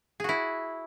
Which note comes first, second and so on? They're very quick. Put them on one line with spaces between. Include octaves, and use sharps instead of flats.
G#4 F#4 E4